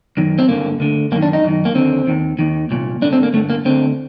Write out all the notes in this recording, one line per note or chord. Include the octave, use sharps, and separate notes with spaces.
F#2 D#3
C4
G2 D3 A#3
D2 D3
F#2 D#3 A#3
D4
D#4
F#2 D#3
A#3
D#2 D3 C4
D#2 D#3
D#2 D#3
C2 A#2
G2 D3 D4
C4
A#3
G2 D3 A3
A#3
D2 D3 C4